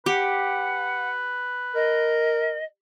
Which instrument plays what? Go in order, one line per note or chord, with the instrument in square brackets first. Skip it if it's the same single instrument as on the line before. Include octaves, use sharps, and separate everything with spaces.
[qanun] G4 [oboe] B4 [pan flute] F#5
[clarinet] A#4 [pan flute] D#5